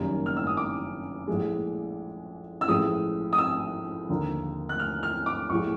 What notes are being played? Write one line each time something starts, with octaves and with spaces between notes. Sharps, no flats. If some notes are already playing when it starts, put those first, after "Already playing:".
Already playing: F#1 F#2 D#3 G3 A#3
F6
E6
D#6
D6
A#1 A2 F3 G#3
E6
A1 A2 F3 G#3 D#6
D#6
E6
D#2 D3 F3 A#3
F#6
F6
F6
D6
A#1 A2 F3 G#3 C#6